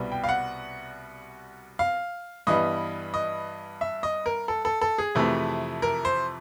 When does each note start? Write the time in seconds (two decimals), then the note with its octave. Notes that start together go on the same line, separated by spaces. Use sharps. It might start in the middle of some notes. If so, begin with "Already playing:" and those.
Already playing: C2 B2 G3 B3
0.12 G5
0.24 F5
0.29 F#5
1.79 F5
2.47 G2 E3 G3 B3 D#5
3.14 D#5
3.81 E5
4.03 D#5
4.26 A#4
4.48 A4
4.65 A4
4.81 A4
4.98 G#4
5.15 F2 C3 E3 A3
5.82 A#4
6.05 C5